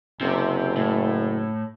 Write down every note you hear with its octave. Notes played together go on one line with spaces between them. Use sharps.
F#1 C3
A2